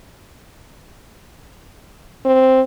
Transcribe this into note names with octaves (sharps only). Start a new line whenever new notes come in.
C4